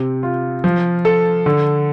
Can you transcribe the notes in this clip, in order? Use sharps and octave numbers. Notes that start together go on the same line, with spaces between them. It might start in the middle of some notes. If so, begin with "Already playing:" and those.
Already playing: C3 C4
F4
F3
A4
D3